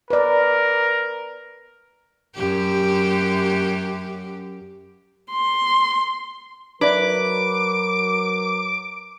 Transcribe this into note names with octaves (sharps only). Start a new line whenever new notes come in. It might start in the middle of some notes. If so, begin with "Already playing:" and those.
A#4 B4 D5
F#2 G4
C6
F#3 D#4 A#4 B4 D5 E5 D6